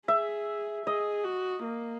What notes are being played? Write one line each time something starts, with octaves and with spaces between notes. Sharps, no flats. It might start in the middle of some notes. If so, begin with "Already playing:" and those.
G#4 E5
G#4 D#5
F#4
A#3